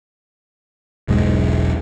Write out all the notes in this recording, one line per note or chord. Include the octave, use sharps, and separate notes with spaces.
E1 B1 G#2 G#3